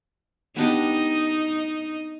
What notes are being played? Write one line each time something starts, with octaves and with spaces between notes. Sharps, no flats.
B3 D4 D#4 G4